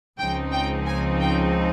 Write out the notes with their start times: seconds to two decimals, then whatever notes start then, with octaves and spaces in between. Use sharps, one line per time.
0.18 C#2 C#3 F3 C4 D#4 G5
0.52 G5
0.86 G#5
1.20 G5